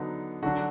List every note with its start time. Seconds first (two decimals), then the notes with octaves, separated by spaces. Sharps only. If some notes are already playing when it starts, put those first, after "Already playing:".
Already playing: D3 F#3 B3 D#4
0.43 D3 F#3 D4 F#4